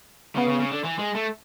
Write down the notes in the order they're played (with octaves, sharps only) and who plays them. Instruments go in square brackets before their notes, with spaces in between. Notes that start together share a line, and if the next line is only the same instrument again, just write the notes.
[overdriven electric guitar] C#3 [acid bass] B3
[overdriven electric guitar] C#3
C#3
D3
E3
G#3
A3